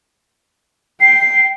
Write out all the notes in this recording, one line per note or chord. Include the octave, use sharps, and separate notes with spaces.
G5 C7